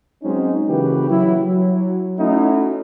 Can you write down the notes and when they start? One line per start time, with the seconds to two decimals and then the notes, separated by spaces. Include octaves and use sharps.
0.24 F#3 G#3 C4 C#4 D#4
0.68 C#3 E3 A#3 F#4 G4 B4
1.10 F#3 E4
1.47 F#3
2.18 A3 C#4 D#4 E4 F#4